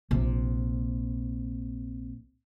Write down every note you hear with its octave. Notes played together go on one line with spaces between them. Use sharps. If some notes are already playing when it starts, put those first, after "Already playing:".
A#1 C3